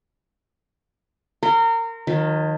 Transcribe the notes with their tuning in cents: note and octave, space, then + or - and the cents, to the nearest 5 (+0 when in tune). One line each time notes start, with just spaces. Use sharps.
A#4 -25 C6 +0
D#3 +0 F#3 -45